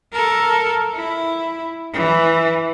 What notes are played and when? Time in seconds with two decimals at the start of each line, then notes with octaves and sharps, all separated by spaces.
0.12 A4 A#4
0.95 E4
1.93 E3